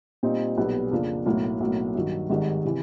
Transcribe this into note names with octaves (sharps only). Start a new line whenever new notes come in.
A#2 G3 C4 D#4
B1 A#2 G3 B3
F2 C#3 F3 A#3 D4
B1 A2 F#3 A#3
B1 A2 F#3 A#3
G2 D#3 F#3
G#1 G#2 D#3 G3
C3 E3